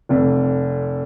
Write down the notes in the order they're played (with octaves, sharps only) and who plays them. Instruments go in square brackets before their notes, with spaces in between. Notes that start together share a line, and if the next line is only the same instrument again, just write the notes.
[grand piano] F1 F2